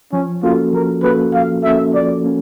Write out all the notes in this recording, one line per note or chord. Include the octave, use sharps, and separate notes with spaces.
F3 C#4
A#3 C#4 F4 F#4 A4
F3 A#4
A#3 C#4 F#4 A4 B4
F3 F5
A#3 C#4 F#4 A4 E5
F3 D5
A#3 C#4